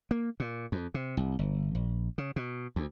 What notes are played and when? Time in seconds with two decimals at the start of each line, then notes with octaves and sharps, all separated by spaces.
0.11 A#3
0.40 A#2
0.72 F2
0.94 C3
1.17 C2
1.39 G1
1.75 A#1
2.18 C#3
2.36 B2
2.76 D2